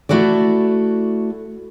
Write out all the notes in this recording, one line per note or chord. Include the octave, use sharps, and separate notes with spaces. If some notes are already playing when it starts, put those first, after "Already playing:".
A3 E4 F#4 A4 D5